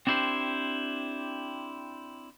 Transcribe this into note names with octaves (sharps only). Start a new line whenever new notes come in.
C4 D4 E4 G4 C5